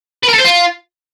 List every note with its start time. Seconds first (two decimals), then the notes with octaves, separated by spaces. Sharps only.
0.23 B4
0.28 A#4
0.34 A4
0.39 C5
0.45 F4